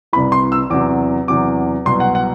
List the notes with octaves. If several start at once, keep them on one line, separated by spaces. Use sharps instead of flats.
C2 C3 E3 B5
C6
E6
E2 C3 F#3 D6
E2 C3 F#3 D6
C2 B2 F#3 C6
F#5
F#5